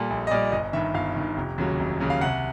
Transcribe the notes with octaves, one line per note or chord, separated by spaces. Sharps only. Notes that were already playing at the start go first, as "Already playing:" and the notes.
Already playing: A#2 G3 A4
A#1
D#5
A#2 G3 D5
G1 D#5
G2 D#3 E5
G1 F5
G2 D#3
F1
D#2 C#3 F#3
F1
D#2 C#3 F#3
F5
C2 F#5